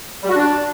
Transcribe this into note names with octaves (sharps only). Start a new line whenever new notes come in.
G3
F#4
D4